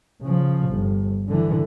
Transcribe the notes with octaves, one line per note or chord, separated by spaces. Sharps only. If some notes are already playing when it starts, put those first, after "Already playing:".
C#3 F3
G1
D3 E3